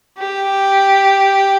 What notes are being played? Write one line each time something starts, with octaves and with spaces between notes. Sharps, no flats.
G4